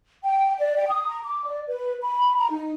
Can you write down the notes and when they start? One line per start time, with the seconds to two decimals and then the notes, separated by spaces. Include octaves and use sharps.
0.24 G5
0.59 D5
0.76 G5
0.88 D#6
1.08 A#5
1.24 D6
1.45 D5
1.67 B4
2.01 B5
2.37 A#5
2.50 D#4